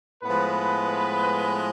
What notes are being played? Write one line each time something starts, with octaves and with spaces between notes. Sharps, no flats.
A2 F3 G#3 B3 B4